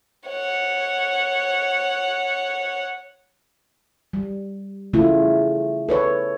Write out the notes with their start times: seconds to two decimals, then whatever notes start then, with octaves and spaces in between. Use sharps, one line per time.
0.28 C#5 F#5
4.13 G3
4.93 C#3 A3 E4 F4
5.89 A4 B4 C#5